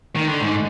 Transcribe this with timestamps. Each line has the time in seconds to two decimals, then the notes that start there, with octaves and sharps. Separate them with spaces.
0.16 D#3
0.27 D3
0.41 G#2